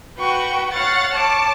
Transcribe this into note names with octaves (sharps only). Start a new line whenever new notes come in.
F#4 B4 G5 C#6
C#5 F5 F#5 A6
C#5 A5 D6